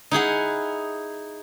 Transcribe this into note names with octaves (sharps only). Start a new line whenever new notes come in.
D#4 E4 G#4 F#5